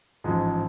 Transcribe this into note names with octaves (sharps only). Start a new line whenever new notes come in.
A1 G#2 F3 G#3